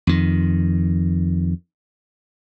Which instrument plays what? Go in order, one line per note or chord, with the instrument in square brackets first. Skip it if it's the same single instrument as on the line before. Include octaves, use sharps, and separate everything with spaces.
[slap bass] F2 D#3